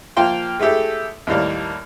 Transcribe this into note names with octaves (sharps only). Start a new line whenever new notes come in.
F3 A#3 F5 G5 C6
G#3 A3 E4 G4 A4
D#2 A2 G3 A#3